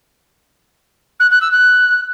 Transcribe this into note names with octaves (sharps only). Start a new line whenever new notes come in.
F#6
F#6
E6
F#6